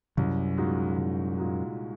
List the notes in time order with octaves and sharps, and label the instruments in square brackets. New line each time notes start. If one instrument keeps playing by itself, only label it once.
[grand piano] C2 [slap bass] F#2
[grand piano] A#2 G#3 D#4 F#4
C2
A#2 G#3 D#4 F#4